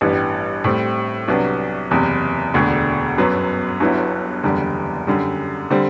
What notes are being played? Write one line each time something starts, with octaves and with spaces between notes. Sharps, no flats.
A1 G2 E3 G3 B3
A2 G3 C4
C2 C3 F#3 B3 D4
F#1 E2 C3
E1 D2 D3
G1 F#2 F#3 B3
G1 G2 F#3 B3 E4
F#1 E2 D3 G3
F#2 D3 G3
D3 G3 C4